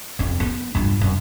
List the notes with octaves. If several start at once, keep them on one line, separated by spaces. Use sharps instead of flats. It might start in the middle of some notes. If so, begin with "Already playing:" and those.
F2 C#4
D#3 B3
G2 F4
F#2